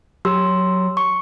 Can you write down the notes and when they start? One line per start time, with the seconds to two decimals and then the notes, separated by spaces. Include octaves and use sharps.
0.25 F#3 G4 C6 E6
0.97 C#6